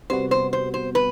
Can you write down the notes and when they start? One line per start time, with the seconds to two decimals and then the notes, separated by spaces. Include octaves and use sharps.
0.10 C3 G3 B3 F#4 C5
0.31 C5
0.53 C5
0.74 C5
0.95 B4